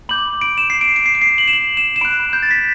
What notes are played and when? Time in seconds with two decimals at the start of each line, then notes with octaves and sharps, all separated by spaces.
0.09 B5 D6 G6 F#7
0.41 D7
0.58 E7
0.70 C7
0.81 D7
0.96 D7
1.06 C7
1.15 D7
1.22 C7
1.38 F#7
1.48 E7
1.53 F#7
1.77 E7
1.96 E7
2.01 B5 F#6 D7
2.33 G6
2.42 A6
2.51 B6